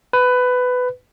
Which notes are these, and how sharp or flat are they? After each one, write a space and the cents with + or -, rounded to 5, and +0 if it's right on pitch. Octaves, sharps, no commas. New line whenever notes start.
B4 +15